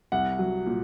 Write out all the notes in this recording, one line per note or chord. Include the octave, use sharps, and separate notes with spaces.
C2 F#5
F#3
A#2